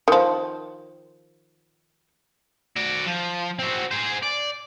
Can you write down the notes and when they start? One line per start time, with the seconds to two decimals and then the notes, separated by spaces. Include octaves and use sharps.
0.08 D#3 F3
2.76 F#4 D5
3.06 F3
3.59 C4 F#4
3.91 G#4 C5
4.23 D5